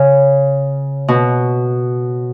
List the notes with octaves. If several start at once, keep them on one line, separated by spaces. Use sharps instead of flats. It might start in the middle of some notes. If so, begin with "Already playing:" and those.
Already playing: C#3
B2